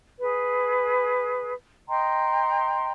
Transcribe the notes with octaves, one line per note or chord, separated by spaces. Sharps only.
G#4 B4
D#5 G5 A#5 C6